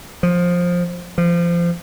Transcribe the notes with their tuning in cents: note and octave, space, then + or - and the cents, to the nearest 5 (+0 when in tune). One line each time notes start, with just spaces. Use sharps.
F3 +15
F3 -25